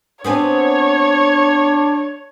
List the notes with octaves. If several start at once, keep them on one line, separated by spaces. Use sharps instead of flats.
B3 C4 D4 G#4 C#5